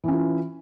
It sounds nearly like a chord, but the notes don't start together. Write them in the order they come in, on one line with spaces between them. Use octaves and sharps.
E3 C#4 F4